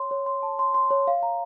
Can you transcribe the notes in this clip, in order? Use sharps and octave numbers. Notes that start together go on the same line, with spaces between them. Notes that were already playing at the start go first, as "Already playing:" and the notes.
Already playing: C#5 C6
C#5
C6
A5
C6
C6
C#5
F5
A#5